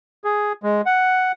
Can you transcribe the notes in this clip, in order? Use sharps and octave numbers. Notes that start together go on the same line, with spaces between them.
G#4
G#3
F#5